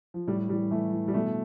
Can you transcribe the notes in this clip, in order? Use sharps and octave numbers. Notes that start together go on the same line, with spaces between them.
F3
A2 G3
E3 G3
E3 A3
E3
G3
B2 A3